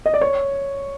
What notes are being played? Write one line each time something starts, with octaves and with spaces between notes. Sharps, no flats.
D#5
D5
C#5